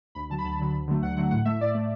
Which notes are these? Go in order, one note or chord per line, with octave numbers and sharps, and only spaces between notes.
D2 B5
D3 F#3 A5
B5
D2 A5
D3 F#3
D2
D3 F#3 A3
D2 F#5
D3 F#3 A3 F#5
A2 F#5
A3 E5
A2 D5
A3